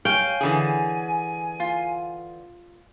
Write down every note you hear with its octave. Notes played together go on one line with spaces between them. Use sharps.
C#5 F5 G5 G#5
D3 E3 G#4
F4